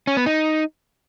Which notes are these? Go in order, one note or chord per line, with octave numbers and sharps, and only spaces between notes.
C#4
B3
D#4